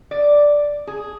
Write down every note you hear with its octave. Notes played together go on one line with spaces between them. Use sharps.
D5
G#4